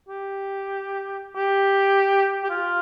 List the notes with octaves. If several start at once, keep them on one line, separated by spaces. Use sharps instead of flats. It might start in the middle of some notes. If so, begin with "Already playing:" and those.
G4
G4
G4
F4